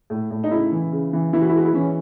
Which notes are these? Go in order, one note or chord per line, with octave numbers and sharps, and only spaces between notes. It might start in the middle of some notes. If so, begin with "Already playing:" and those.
A2
A2
D#4
C#3 E4
E3
C#3
E3
E3 E4
F#4
E4
G#3 F#4
E4
E3 C#4